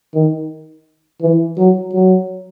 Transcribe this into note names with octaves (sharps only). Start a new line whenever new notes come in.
D#3
E3
F#3
F#3